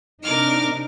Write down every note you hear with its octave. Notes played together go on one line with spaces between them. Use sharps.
C3 D4 D#4 A#4 D6 F6